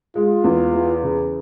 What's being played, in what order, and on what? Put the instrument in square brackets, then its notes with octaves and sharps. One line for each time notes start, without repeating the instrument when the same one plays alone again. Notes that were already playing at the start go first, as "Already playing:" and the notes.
[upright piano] G#3 [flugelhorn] F4
[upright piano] E2
E3
C#3